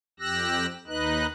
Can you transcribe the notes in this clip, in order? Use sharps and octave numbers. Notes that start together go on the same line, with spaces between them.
F2 G4 E6 F#6 A#6
D#2 D#4 B4 D#5 F#6